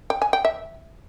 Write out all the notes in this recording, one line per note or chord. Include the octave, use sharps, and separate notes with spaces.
G5
G#5
G5
E5